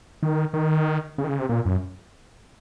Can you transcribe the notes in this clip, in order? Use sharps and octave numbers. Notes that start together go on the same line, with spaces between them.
D#3
D#3
C#3
D#3
C#3
C3
A#2
F#2